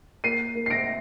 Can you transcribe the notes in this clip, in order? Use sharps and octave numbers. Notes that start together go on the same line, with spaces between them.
A#3 C7 D#7
A#3
C7
A#6 D7